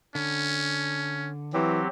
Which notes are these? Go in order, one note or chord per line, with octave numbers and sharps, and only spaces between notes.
D3 C#4
E3 F#3 C4 G4